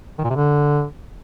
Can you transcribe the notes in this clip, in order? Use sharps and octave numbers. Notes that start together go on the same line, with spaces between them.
D#3
A#2
C3
D3